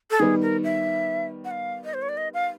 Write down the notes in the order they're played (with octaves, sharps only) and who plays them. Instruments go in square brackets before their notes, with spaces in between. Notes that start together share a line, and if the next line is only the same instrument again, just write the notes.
[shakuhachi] A4
[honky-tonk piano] D#3 G3 B3 [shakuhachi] G#4
[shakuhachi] A#4
E5
F#5
F5
D#5
C5
C#5
D5
D#5
F5